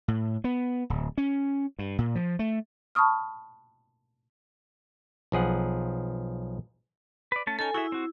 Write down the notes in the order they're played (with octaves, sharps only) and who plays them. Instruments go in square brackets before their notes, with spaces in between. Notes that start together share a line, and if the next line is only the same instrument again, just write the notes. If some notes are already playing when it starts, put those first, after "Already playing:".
[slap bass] A2
B3
D1
C#4
G2
A#2
F3
A3
[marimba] A5 B5 C#6 D#6 F6
[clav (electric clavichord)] B1 F3 G#4 F#5
[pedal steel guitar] B4 D5
A3 C#4 A5
[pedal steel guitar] C#4 D#4 A5 [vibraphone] A4 G#5
[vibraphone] E4 [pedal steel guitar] F#4 G#4 E5
[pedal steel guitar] C4 F#4